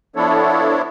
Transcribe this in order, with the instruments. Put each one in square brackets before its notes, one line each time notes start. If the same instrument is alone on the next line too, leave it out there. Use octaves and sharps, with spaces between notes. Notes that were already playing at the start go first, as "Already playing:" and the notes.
[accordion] F3 B3 D4 E4 A4 C#5